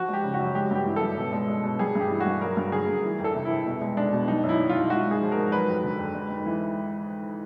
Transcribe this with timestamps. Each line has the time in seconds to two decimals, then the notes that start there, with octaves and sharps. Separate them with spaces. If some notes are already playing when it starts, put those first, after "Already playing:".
Already playing: F3 F#4
0.08 G#3 G4
0.24 C#3
0.34 F#4
0.39 F#2
0.55 G#3 G4
0.71 G2 G4
0.86 E3
0.96 A4
1.02 G2
1.17 B2
1.33 G#3
1.48 G#3
1.64 B2
1.79 G3 G#4
1.95 G2 G4
2.10 E3
2.21 F#4
2.26 G2
2.41 F#3 A#4
2.57 G2
2.72 D3 G#4
2.88 G2
3.04 E3
3.19 F2
3.24 A4
3.35 C3
3.45 E4
3.50 F2
3.66 B2
3.82 G#3
3.97 G#3 D4
4.13 B2
4.28 G3 D#4
4.44 F#2
4.49 E4
4.59 D#3
4.70 F4
4.75 F#2
4.90 G#3 F#4
5.06 G#2
5.11 G#4
5.22 F3
5.32 A#4
5.37 G#2
5.52 F#3 B4
5.68 F2
5.84 D3
5.99 F2
6.15 G#3
6.30 G#2
6.46 E3